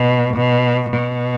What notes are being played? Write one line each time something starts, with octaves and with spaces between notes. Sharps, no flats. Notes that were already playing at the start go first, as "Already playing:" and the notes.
Already playing: B2
B2
B2